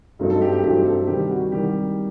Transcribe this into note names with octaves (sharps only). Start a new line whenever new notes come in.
G2 F#3 A3 C4 D#4
A4
G4
G4
G2 F#3 A3 C4 D#4 G4
G4
A4
C3 D#3 G3 G4
F#4
C3 D#3 G3 G4